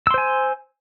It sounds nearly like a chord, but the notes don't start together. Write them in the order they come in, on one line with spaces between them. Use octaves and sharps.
E6 C6 C5 G#5